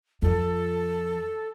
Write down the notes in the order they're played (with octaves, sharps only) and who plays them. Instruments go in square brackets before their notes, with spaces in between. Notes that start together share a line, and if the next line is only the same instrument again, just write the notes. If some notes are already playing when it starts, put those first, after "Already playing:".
[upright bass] F2 F3 [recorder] A4